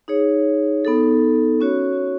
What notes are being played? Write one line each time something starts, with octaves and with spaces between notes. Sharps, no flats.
D#4 G#4 C#5
B3 D#4 A4
C#4 F#4 C#5